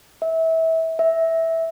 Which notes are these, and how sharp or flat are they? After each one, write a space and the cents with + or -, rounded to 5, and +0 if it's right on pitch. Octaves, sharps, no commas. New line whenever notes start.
E5 -25
E5 -10